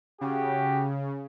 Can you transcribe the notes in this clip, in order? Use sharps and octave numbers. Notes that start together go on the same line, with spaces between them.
C#3 F#4 G4